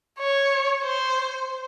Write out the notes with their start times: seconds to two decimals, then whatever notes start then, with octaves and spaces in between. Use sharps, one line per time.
0.19 C#5
0.83 C5